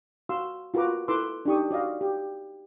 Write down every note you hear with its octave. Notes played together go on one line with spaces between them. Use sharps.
F#4 F5 C6 E6
F4 F#4 A#4 B4 A#5 D6
E4 A4 B4 C6 D6 E6
D4 D#4 G4 C#6 D#6
F#4 D5 D#5 F5
G4